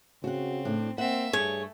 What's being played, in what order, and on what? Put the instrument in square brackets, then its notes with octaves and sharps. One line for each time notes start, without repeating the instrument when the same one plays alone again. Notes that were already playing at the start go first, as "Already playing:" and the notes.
[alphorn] C#3 [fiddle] C4 [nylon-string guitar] F#4 F#5
[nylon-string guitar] A2 D4
[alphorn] A#3 [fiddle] C4 E5 [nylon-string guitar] F#5
[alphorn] G2 [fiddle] A3 [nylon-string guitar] G#4 [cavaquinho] C#5